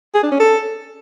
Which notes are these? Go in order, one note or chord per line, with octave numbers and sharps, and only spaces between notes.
G#4
D4
C#4
A4